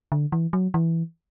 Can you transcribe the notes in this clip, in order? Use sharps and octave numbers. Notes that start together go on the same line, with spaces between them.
D3
E3
F#3
E3